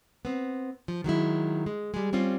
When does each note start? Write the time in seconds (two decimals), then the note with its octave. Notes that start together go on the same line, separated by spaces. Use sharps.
0.25 B3 C4
0.88 F3
1.04 D#3 F#3 G#3 E4
1.66 G#3
1.94 G3 G#3
2.13 G3 C4 C#4 F4